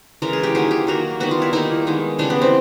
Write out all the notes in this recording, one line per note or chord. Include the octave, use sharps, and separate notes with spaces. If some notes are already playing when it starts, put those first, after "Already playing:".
C#3 E3 G#3 A#4
G#4
G4
D#3 F#3 A#3 G#4
G4
D#3 F#3 A#3 F#4
D#3 G3 B3 F#4
F4
E4
D#3 G3 A#3 D#4
D#3 G#3 B3
C#3 E3 G3 D4
B3
C4